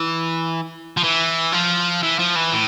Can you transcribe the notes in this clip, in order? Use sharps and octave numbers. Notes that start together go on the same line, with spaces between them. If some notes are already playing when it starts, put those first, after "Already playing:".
Already playing: E3
F3
E3
F3
E3
F3
E3
A2